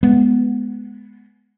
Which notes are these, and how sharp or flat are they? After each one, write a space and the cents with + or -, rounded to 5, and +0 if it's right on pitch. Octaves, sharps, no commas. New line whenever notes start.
G#3 +15 B3 +0